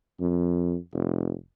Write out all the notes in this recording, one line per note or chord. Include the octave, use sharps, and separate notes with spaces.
F2
F1